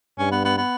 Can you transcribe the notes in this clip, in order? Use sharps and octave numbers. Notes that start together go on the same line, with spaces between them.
G2 C#4
B3
B3
B3